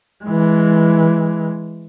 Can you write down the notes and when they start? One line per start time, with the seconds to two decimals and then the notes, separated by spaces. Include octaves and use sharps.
0.25 E3 G#3